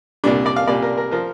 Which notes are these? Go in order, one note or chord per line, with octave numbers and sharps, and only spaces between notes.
C2 A#2 G3 D4
D5
F5
C2 A#2 G3 D5
A#4
A#4
F3 A#4